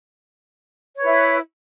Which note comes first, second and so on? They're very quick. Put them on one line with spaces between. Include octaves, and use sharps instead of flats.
C#5 B4 E4